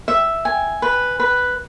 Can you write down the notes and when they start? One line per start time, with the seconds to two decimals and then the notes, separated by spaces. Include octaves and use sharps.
0.08 E5
0.45 G#5
0.82 B4
1.20 B4